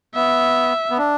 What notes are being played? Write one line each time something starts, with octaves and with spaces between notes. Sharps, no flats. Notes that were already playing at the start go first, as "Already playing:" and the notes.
B3 E5
B3
D4